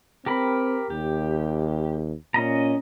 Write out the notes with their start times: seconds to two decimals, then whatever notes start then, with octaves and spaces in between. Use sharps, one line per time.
0.26 C4 G4 A#4 B5
0.90 D#2 G4
2.34 A#2 C#4 D#5 A#5